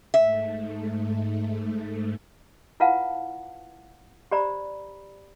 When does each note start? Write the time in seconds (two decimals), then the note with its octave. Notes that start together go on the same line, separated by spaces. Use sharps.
0.14 G#2 A3 E5
2.80 E4 F4 B4 F5 F#5 A5
4.31 G4 C5 D5 A#5 B5